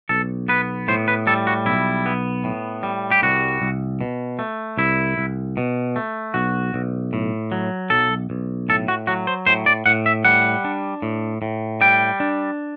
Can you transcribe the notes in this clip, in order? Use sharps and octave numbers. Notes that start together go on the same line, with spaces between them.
B1 A4
B3 B4
A2 C5
B4
G3 A4
F#4
B1 E4
B3
A2
G3
G4
C2 F#4
C2
B2
A3
C2 E4
C2
B2
A3
B1 F#4
B1
A2
F#3
B1 A4
B1
A2 A4
F#4
F#3 F#4
C5
A2 C5
D5
A2 F#5
E5
G3 F#5
D4
A2
A2
G3 G5
D4